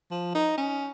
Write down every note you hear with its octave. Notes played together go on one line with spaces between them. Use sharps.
F3
D#4
C#4